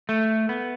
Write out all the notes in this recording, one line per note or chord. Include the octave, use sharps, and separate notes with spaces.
A3
B3